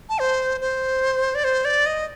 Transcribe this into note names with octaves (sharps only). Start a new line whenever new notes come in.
A5
C5
C5
D5
C5
D5
D#5